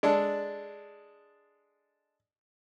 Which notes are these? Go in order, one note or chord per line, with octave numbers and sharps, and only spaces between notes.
G#3 D4 A4